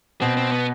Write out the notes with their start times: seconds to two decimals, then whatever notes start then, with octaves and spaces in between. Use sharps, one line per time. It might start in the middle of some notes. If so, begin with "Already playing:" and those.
0.21 B2 C4
0.37 C4
0.52 B3